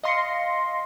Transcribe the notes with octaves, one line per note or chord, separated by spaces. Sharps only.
D#5 F5 C6 A#6 C7 C#7